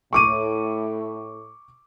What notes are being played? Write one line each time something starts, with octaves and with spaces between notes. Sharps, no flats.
A2 C#6 D6 D#7